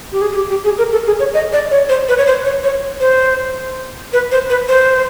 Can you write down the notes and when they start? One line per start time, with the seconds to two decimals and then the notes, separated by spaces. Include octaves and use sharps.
0.13 G4
0.21 G#4
0.32 G#4
0.36 G4
0.50 G4
0.64 G#4
0.78 A#4
0.92 A4
1.06 G#4
1.19 C#5
1.34 D#5
1.53 D5
1.71 C#5
1.89 C5
2.09 B4
2.18 C#5
2.27 C5
2.45 C#5
2.64 C#5
3.01 C5
4.13 B4
4.32 C5
4.50 B4
4.69 C5